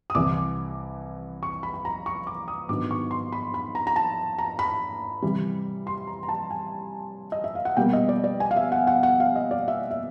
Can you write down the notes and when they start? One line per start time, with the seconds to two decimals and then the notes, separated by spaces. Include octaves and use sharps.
0.10 D#6
0.15 C2 C3 E3 D6
1.43 C#6
1.63 B5
1.74 B5
1.85 A#5
2.06 C#6
2.27 D6
2.48 D#6
2.69 G#2 D#3 F#3 B3 D4 D6
2.91 C#6
3.11 C6
3.32 B5
3.54 B5
3.75 A#5
3.87 A#5
3.96 A5
4.38 A#5
4.59 B5
5.22 C3 E3 G3
5.87 C6
6.07 A#5
6.23 A#5
6.29 A5
6.50 G#5
7.32 D#5
7.44 E5
7.55 F5
7.65 F#5
7.77 B2 G3 A#3 G5
7.93 D#5
8.09 D5
8.24 D5
8.40 G#5
8.51 F5
8.56 E5
8.72 F#5
8.87 F#5
9.03 F#5
9.20 F5
9.36 D#5
9.51 D5
9.68 E5
9.91 E5